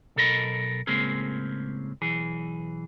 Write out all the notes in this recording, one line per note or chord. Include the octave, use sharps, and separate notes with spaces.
B1 B2 A4 A#4 D#5 B5
A2 C#3 G#3 A#3 C4 G#4
B1 E3 G#4